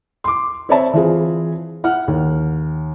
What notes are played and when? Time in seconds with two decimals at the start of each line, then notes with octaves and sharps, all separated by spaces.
0.24 C6 D6
0.69 C4 C#5 D5 E5 A5
0.94 E3 C4 F4 G#4
1.84 E4 F#5 F6
2.08 D#2